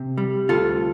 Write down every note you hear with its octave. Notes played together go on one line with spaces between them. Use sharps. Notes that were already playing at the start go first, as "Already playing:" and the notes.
Already playing: C3
G3
D2 F4 A4